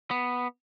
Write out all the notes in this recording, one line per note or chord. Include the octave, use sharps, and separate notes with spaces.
B3